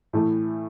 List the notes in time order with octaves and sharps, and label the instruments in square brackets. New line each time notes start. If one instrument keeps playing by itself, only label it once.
[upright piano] A2 E3 A3